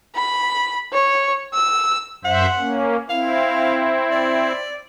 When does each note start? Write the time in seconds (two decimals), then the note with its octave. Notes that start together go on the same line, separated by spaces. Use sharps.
0.15 B5
0.93 C#5
1.54 E6
2.25 F#2 C5 E5 F#5
2.57 A#3 C#4
3.09 C4 E4 F5
4.12 D5